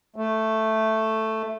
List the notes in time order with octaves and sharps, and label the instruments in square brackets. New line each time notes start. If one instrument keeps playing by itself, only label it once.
[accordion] A3